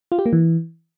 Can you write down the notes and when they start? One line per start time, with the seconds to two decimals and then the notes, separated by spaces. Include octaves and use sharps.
0.12 F4
0.19 G4
0.26 A#3
0.33 E3